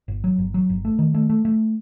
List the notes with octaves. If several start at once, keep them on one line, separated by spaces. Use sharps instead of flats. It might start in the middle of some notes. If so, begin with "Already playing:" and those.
G1
F#3
G1
F#3
G1
A3
D#3
A3
A3
A3